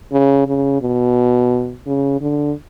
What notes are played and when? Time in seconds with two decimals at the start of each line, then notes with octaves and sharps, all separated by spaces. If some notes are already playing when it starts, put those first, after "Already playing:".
0.12 C#3
0.47 C#3
0.82 B2
1.87 C#3
2.21 D3